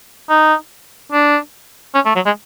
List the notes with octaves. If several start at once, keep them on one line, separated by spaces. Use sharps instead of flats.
D#4
D4
C#4
A3
F#3
G#3